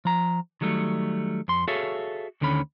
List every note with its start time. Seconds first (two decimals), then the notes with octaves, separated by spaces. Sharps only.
0.05 F3 A#5
0.61 D#3 F#3 G3 A3
1.48 F2 C6
1.68 F#4 G#4 A4 C#5 E5 F5
2.41 D2 D3 D#3 C#4 B5